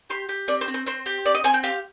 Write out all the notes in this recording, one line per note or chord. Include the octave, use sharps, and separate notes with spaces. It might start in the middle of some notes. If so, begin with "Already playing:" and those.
G4 C6
G4
C4 D5
C5
C4
C5
C4 C5
G4
C4 D5
D#5
C4 G#5
G5
G4 F5